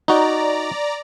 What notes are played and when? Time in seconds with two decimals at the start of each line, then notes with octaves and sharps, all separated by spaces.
0.08 D#4 F#4 D5 A#5